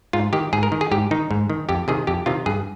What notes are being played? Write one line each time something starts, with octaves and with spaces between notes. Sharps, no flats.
G#2 F4
D#3 G4
G#2 G#4
A#4
D#3
G#4
G#2 G4
D#3 D#4
G#2
D#3
F2 G4
C3 D#3 G#4
F2 G4
C3 D#3 F4
G2 G#4